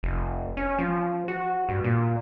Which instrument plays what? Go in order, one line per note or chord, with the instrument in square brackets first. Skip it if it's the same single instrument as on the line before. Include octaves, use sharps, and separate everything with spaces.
[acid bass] F1
C#4
F3
F#4
G2
A#2